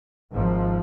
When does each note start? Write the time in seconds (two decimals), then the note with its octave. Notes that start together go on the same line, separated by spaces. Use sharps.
0.33 G#1 G#2 F3